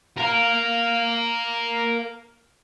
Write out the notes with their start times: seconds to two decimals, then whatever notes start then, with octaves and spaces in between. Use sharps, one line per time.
0.17 A#4 F5